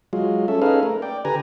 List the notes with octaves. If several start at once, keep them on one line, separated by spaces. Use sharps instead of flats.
F#3 G#3 F4
C#4 A4 E5
C#4 D#4 G#4 A4 B4 F5
A3 A#4
D5 G5
D3 G4 B4 G#5 A#5